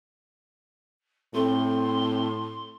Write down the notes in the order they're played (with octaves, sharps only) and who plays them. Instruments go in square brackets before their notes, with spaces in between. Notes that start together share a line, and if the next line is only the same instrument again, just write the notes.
[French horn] A2 [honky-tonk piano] A3 [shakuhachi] C4 [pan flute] C6